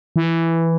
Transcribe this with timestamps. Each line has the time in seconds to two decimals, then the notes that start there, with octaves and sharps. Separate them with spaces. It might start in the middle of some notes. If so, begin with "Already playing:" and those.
0.16 E3